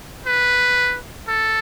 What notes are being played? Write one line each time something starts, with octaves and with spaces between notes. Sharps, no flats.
B4
A4